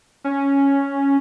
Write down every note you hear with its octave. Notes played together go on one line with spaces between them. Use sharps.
C#4